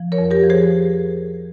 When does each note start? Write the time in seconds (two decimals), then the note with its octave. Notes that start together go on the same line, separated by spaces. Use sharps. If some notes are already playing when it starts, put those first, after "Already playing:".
Already playing: F3
0.12 A#4 C#5
0.18 F2
0.31 G4 A#4
0.44 F3
0.50 G#4 C5